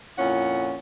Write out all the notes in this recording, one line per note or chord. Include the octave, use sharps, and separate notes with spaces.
F2 A#2 C#4 E4 F#5